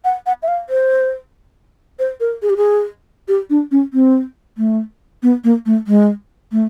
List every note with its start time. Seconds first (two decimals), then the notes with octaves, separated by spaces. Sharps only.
0.04 F#5
0.26 F#5
0.42 E5
0.48 F5
0.69 C5
1.99 C5
2.20 A#4
2.42 G#4
2.49 G4
2.57 G#4
3.28 G4
3.50 D4
3.71 C#4
3.93 C4
4.58 A3
5.23 B3
5.44 A#3
5.66 A3
5.87 G#3
6.52 A3